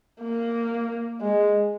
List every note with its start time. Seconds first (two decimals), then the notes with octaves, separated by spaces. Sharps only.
0.22 A#3
1.21 G#3